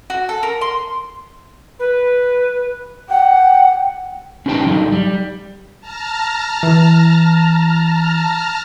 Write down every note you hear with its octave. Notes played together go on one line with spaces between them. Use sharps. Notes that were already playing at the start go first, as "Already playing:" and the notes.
F#4
A4
A#4
C6
B4
F#5 G5
C#4 D#4 G4 B4 G5 A5
F#3 G3 D#4
G3
A5 A#5 F6
E3